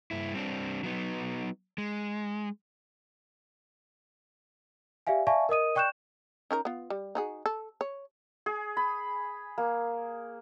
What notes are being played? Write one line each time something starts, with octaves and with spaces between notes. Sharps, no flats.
G2 E4
G3 C4 D4
F#3 B3 D#4
G#3
G4 D5 E5 F5 G#5
D5 E5 F5 G#5 A5 C#6
A#4 D#5 D#6 D#7
D5 G5 C#6 F#6 G6 E7
C#4 D#4 A#4
B3 F4
G3
D#4 F#4 G#4
A4
C#5
G#4
B5
A#3